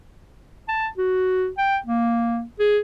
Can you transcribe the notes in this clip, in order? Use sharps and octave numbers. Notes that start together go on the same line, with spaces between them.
A5
F#4
G5
A#3
G#4